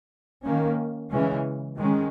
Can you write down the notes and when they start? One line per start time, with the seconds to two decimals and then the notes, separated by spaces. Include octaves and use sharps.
0.43 D#3 A#3 C#4
1.10 C#3 E3 G#3 C#4
1.78 D#3 G#3 C#4